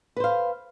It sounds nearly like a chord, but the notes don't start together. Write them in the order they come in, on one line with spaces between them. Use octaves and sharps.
B4 C5 F5